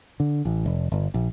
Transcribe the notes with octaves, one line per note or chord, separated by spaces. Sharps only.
D3
A1
F1
G1
A#1